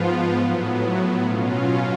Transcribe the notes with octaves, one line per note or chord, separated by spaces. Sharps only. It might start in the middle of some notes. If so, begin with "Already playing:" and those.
Already playing: G#2 F3 B3 F4
A2 F#3 B3
B2 F#3 C#4 F4 F5
F5